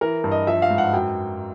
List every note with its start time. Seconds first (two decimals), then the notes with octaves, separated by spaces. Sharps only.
0.01 E3 A#4
0.24 G2
0.31 D#5
0.47 F3 E5
0.62 F5
0.70 G#2
0.78 F#5
0.93 F#2 G5